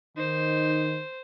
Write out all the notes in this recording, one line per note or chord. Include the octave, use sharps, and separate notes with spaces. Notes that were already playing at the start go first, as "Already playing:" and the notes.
D#3 D#4 C5